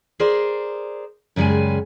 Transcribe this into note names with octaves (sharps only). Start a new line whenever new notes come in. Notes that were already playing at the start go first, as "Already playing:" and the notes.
G#4 A#4 C5 D5
F#2 C#3 G3 G#3 G#5